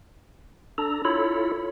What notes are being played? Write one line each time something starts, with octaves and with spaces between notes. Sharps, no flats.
D4 A4 A#5
E4 F4 A4 C#5 B5